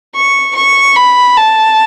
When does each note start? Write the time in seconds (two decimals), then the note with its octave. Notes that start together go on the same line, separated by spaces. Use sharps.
0.15 C#6
0.55 C#6
0.96 B5
1.37 A5